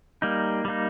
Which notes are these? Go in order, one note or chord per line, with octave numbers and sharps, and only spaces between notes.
G3 A#3 D#4
G3 A#3 D#4